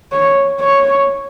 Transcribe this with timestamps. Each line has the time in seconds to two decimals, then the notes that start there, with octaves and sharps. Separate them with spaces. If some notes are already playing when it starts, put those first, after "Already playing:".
0.12 C#5
0.60 C#5